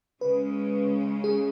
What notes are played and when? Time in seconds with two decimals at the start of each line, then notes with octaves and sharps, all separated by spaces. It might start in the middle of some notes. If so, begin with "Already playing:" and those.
0.21 C#3 G#3 C#4 B4
1.24 G#4